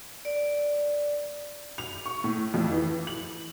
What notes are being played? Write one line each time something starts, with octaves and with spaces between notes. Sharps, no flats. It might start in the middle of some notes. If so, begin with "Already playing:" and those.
D5
F7
C#6
A2
F2
E3
F#7